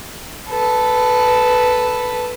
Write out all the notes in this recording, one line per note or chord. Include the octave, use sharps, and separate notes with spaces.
A4 B4